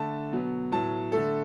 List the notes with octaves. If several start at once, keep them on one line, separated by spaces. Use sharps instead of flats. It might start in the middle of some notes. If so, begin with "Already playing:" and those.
Already playing: D3 A3 A5
B2 F#3 B3
A2 F#3 B3 A5
D3 A3 A4